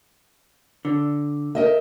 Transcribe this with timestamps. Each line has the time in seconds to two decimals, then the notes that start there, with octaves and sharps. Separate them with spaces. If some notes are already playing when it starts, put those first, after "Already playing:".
0.85 D3
1.55 A#4 D#5 E5